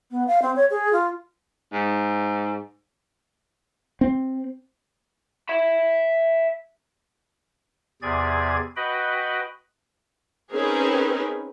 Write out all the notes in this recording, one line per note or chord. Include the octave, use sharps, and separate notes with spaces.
B3
F5
C4
C#5
G#4
F4
G#2
C4
E5 B5
E2 C3 G#4 D5 G#6
F#4 B4 D#5 G5 B5
C4 C#4 D#4 G#4 A#4 B4